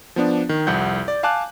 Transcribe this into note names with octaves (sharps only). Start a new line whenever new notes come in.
F3 B3 D4
D#3
C2 F2 F#5 G6
D5
F5 G#5 A5 D6 F#6